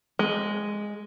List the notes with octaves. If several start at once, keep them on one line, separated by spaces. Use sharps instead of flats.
G#3